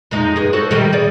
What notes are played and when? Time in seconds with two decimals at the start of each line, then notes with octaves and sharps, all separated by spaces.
0.11 F2 G#3 D#4
0.36 G2 G#4
0.53 F#4 A4 C5
0.71 G#2 D#3 G3
0.93 G#4 D5